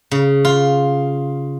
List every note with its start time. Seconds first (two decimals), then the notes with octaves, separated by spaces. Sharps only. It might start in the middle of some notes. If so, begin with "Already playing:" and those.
0.11 C#3
0.45 F4